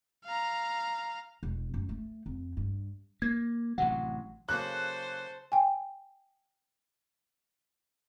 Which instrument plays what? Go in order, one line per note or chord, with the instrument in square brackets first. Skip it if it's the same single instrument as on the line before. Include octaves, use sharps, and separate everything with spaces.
[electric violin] F5 A#5
[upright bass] E1
F#2
A3
F2
G2
[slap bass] A#3 [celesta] G#6
[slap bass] A1 C3 F#3 [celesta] F#5
[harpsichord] C#3 F#3 A#3 [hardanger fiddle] A4 C5 [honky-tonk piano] F#6
[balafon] G5 G#5